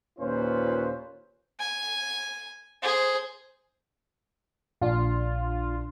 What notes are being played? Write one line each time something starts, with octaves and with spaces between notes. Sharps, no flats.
D#2 A#2 C#4 F4 B4 C5
G#5
G#4 C5
A#1 D4 F4